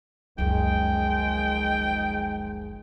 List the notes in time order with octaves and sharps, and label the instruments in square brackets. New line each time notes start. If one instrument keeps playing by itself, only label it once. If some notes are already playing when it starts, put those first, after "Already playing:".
[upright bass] F#1 C#2 [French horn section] D#3 F3 G#3 [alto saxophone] G5